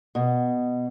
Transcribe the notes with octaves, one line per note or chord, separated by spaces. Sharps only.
B2